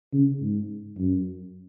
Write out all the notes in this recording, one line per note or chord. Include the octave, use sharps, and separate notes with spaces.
C#3
G#2
F#2